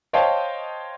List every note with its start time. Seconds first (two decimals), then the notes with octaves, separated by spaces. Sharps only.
0.13 C5 C#5 D#5 F5 G5 A5